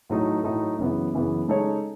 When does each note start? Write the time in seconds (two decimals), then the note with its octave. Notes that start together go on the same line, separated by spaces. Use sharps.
0.10 A2 F#3 A3 D#4
0.44 A2 F#3 A3 D#4
0.78 F#2 C#3 E3 B3
1.13 F#2 C#3 E3 B3
1.48 C#3 G#3 D#4 A4 C#5